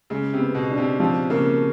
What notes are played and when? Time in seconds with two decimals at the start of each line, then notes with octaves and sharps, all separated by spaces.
0.10 C#3 G#3
0.34 C3
0.40 B3
0.55 B2
0.71 D4
0.78 C3
1.00 C3 F3
1.30 C#3 A#3